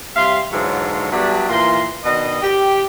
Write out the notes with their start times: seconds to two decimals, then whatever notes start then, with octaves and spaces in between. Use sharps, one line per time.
0.16 C3 G3 E5 F5 C6
0.53 G#2 D3 E3 F#3 F4 C#5
1.12 F#3 G3 A3 B3 D4
1.49 A#2 E3 A#4 C6
2.04 B2 D#3 D4 D#5
2.43 G4